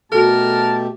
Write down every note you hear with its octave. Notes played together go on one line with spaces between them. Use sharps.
B2 A3 F#4 G4 A4 A#4 A5